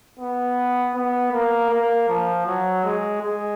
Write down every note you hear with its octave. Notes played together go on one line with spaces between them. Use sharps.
B3
B3
A#3
A#3
F3
F#3
G#3
G#3